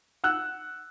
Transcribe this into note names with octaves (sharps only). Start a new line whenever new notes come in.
F#5 E6 F#6